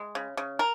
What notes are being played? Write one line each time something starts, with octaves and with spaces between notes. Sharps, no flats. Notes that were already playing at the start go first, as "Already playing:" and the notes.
Already playing: G#3
C#3
C#3
A#4